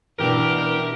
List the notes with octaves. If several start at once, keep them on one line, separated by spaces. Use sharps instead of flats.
B2 E3 D4 G4 A#4